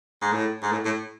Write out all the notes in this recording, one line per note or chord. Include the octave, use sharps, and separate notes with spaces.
G#2
A2
G#2
A2
A2